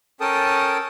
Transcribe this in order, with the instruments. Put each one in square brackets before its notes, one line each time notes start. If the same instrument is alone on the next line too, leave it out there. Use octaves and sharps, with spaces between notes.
[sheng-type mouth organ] C#4 A4 A#4 G5 A5 D#6